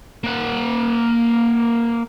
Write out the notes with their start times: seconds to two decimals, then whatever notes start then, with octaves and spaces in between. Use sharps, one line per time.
0.24 A#3 F#5